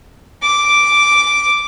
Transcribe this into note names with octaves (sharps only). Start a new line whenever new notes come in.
D6